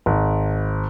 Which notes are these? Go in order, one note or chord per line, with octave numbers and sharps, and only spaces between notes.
G#1